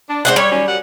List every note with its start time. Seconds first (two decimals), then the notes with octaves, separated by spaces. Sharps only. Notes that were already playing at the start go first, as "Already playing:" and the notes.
0.09 D4
0.25 G#2 C#3 G#3 C5 D#5 F#5
0.36 G3 C#5
0.51 D#3 F#3 C#4
0.67 F#2 G3 F#5